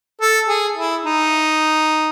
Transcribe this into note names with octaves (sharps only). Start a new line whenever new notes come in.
A4
G#4
E4
D#4